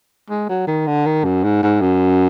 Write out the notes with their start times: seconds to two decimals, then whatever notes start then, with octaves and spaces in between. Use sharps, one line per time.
0.30 G#3
0.49 F#3
0.67 D#3
0.87 D3
1.06 D#3
1.24 F#2
1.43 G#2
1.63 G#2
1.81 F#2